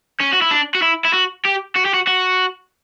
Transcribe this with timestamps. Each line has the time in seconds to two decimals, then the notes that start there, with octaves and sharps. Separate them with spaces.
0.21 C#4
0.33 F#4
0.42 E4
0.51 D4
0.75 F#4
0.82 E4
1.05 E4
1.14 F#4
1.45 G4
1.75 F#4
1.85 G4
1.94 F#4
2.07 F#4